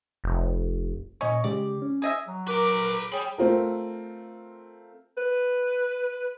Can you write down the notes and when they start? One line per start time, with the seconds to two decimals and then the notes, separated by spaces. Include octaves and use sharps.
0.24 F1
1.21 A#2 C#4 D#5 C#6
1.44 C#3 G#3 G4 D5
1.82 C#4
2.02 G#4 D#5 E5
2.28 F#3
2.48 A#4 B4 A#5 D6
3.12 G#4 C#5 G5 B5
3.38 A3 C4 F4 A#4
5.18 B4